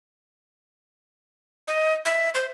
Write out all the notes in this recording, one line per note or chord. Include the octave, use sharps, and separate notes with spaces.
D#5
E5
C5